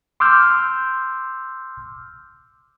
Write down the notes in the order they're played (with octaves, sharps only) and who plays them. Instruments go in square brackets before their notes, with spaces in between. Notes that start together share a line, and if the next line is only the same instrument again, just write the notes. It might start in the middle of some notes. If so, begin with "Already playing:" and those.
[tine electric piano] C6 D6 E6 F6 G6